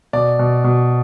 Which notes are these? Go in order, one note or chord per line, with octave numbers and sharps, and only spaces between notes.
B2 D5
B2
B2